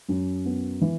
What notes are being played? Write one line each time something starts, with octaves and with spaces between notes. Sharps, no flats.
F#2
B3
E3